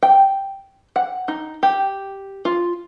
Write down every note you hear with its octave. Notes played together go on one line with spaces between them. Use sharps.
G5
F#5
D#4
G4
F4